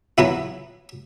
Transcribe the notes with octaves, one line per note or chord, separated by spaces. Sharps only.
E3 F#3 B3 E4